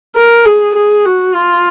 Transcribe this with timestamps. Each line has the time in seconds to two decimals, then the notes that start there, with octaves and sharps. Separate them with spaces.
0.16 A#4
0.45 G#4
0.76 G#4
1.05 F#4
1.34 F4